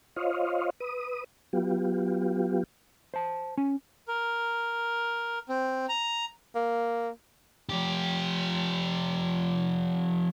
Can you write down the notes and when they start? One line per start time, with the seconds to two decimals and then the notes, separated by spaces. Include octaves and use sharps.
0.16 F4 C5 C#5 D#5 F5
0.80 B4 D#6
1.53 F#3 B3 F4 G4
3.14 C5 A5
3.58 C#4
4.08 A#4
5.49 C4
5.89 A#5
6.55 A#3
7.69 F3 G4